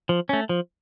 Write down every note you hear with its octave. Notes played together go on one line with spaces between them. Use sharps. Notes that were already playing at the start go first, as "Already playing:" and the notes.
F3
A3 C#4
F3